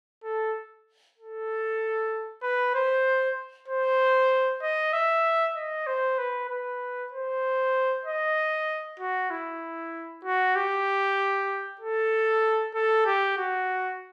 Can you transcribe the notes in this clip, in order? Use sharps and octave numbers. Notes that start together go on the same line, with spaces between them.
A4
A4
B4
C5
C5
D#5
E5
D#5
C5
B4
B4
C5
D#5
F#4
E4
F#4
G4
A4
A4
G4
F#4